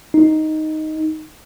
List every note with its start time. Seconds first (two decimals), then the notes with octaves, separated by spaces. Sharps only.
0.14 D#4